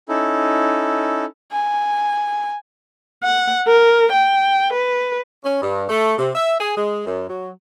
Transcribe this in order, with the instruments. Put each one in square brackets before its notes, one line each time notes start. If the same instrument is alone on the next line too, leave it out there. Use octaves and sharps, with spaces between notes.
[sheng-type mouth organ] C#4 D#4 E4 A4
[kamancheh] G#5
[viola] F#5
A#4
G5
B4
[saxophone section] C#4
G2
A3
C3
E5
G#4
G#3
F#2
F#3